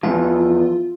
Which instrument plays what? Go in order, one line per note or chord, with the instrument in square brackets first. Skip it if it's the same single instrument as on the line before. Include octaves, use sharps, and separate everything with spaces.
[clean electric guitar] E2 E3 F3 [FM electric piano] F4